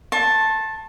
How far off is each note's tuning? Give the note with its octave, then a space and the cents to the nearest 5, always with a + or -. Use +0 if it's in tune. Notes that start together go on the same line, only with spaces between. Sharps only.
A5 +0 C6 +45